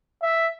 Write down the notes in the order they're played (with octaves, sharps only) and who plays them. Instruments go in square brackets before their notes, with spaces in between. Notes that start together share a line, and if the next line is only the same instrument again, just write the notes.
[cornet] E5